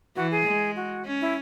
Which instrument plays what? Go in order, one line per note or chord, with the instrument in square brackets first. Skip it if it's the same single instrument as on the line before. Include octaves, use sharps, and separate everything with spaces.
[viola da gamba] E3 [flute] F#4
[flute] G#4
[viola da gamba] G#3
[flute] F#4
[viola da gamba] C#4
[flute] E4